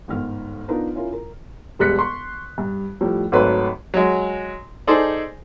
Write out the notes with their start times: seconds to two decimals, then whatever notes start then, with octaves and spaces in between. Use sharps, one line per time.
0.08 G1 G#2 D#3 F6
0.68 B3 D4 D#4 F4 A#4 B4
0.95 C#4 E4 F4 A#4
1.13 A#4
1.79 E1 G3 G#3 F#6 B6 C#7
1.99 C6 C#6
2.58 G2
3.01 A2 F3 G3
3.32 G#1 F#3 A3 B4 C6
3.94 F#3 G#3
4.87 D#4 G#4 A4 C5 D5